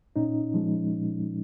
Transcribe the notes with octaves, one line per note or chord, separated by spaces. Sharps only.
A#2 C#4 D#4
F3 G#3
A#2